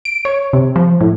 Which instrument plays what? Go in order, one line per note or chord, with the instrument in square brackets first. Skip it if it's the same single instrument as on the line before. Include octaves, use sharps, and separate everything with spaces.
[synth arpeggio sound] D7
C#5
C3
F3
A2